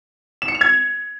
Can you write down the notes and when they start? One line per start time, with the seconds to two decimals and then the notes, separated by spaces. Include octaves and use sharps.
0.42 E7
0.48 C#7
0.55 F7
0.61 G#6